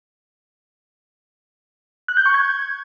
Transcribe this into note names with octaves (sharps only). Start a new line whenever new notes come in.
F#6
G6
C#6
G#6